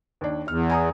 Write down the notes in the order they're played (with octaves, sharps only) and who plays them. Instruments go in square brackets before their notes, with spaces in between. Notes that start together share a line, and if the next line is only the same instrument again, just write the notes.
[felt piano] D#2 D4
[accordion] E2 [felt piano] F6
[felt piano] G#5 A#5 D#6